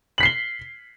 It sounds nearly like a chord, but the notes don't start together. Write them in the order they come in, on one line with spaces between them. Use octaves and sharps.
F#7 B6 C7 G7